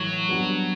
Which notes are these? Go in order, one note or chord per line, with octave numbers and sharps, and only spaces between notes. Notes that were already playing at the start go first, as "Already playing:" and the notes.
Already playing: A2 E3 F#3
G3 B3 D4 F#4